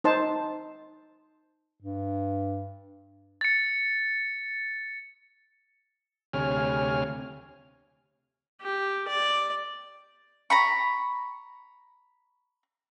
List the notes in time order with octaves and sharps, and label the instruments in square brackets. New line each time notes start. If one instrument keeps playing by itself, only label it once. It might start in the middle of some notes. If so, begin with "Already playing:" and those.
[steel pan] D#4 C5 A5
[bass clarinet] G2
[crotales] A6 C#7
[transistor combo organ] D2 C3 C#5 G#5 F6
[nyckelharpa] G4
D5
[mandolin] A#5 B5 C#6